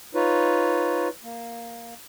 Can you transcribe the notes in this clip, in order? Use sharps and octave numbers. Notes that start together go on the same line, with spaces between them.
D#4 F4 B4 C#5
A#3